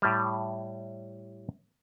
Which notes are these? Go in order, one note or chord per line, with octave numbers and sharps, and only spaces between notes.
A2 G3